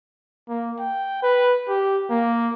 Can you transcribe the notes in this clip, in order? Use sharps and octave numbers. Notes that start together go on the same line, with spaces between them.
A#3
G5
B4
G4
A#3